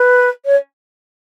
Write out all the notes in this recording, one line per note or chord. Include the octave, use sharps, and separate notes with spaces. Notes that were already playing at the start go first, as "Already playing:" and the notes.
Already playing: B4
C#5